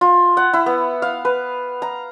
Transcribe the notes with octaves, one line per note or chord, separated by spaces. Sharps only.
F4
F#5
E4
B3
F5
B4
A#5